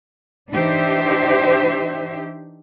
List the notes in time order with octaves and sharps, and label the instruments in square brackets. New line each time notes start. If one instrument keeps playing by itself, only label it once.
[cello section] E3 D4 D#4 G4 C5 E5